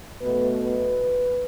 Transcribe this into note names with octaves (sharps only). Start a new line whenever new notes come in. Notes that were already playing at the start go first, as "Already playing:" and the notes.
B2 A3 B4
B4